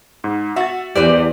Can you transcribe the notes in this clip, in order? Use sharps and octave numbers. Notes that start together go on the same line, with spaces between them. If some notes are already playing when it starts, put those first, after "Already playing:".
G#2
F#4 E5 A6
E2 E3 G4 B4 C5 D5